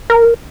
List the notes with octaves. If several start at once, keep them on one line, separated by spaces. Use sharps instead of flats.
A#4